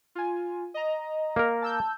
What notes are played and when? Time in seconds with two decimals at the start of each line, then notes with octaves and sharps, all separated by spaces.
0.15 F4 G#5
0.74 D#5 A#5
1.36 A#3 A#4
1.62 A5 E6 G6